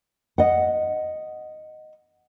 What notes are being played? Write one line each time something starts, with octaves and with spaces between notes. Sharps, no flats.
D#5 F#5